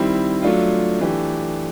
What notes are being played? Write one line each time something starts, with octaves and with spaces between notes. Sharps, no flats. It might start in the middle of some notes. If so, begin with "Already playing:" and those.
Already playing: D#3 G3 C4 E4
F#3 A3 D4 F4
E3 A3 D4 G4